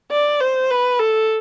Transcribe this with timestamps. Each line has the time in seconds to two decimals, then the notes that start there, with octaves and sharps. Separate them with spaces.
0.12 D5
0.40 C5
0.70 B4
0.99 A4